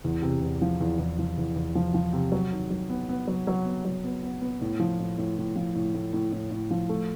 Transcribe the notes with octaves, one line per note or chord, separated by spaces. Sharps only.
E2
C3
E2
F3
E2
E2
F3
E2
E2
F3
F3
C3
F#3
D#3
F#3
B3
B3
F#3
F#3
B3
F#3
B3
B3
B3
A2
F3
A2
A2
A2
F3
A2
A2
A2
A2
A2
F3
A3